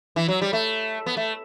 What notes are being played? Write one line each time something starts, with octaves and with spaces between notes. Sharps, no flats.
E3
F#3
G3
A3
B3
A3